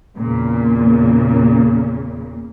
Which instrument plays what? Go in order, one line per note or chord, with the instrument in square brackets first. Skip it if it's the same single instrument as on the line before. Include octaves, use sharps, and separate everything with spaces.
[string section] E2 A#2 C#3